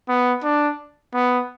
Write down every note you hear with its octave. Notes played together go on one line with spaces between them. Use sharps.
B3
D4
B3